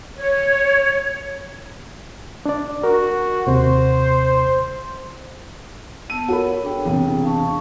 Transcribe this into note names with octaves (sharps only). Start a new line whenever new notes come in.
C#5
D4 D5
F#4 A#4
D#2 C3 C5
B3 A5 E6 D#7
F#4 A4 A#4 C#5 B5
D4 G#4 G5
E1 C3
F5 A5 C#6